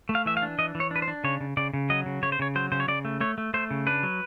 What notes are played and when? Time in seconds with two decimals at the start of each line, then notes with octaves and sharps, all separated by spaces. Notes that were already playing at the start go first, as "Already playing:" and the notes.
0.09 A3
0.15 F5
0.26 E3 E5
0.37 F5
0.42 D4
0.58 E3 D#5
0.75 E3
0.80 C#5
0.91 D4 B4
1.02 C5
1.08 D4
1.24 C#3 C#5
1.40 C#3
1.57 C#3 D5
1.74 C#3
1.90 F#3 D#5
2.06 C#3
2.23 C#3 C#5
2.32 C5
2.39 C#3 C#5
2.55 F#3 C5
2.72 C#3 C5
2.80 C#5
2.88 C#3 D5
3.05 A3
3.21 A3 C#5
3.38 A3
3.54 A3 C5
3.70 C#3
3.87 D4 B4
4.03 F#3